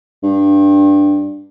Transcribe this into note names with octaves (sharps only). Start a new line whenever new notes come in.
G2